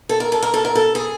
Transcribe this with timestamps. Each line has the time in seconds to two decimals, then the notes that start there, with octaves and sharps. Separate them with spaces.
0.09 A4
0.20 A#4
0.32 A4
0.43 A#4
0.54 A4
0.65 A#4
0.75 A4
0.95 G#4